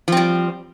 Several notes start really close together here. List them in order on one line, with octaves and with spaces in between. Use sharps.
F3 C4 G3